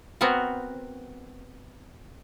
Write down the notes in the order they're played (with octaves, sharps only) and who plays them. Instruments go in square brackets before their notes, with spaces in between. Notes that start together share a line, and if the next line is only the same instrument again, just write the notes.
[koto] B3 C4 F#4 A#4